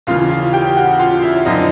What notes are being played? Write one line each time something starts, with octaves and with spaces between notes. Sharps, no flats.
D#2 C#3 E3 F4 F5
F4 F5
G4 G5
F#4 F#5
F4 F5
E4 E5
F#2 D3 F3 D#4 D#5